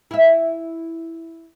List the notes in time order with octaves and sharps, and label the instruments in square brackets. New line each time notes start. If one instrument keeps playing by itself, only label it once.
[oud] E4 E5